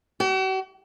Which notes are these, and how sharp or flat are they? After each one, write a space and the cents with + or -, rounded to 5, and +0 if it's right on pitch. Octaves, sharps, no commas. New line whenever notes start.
F#4 +45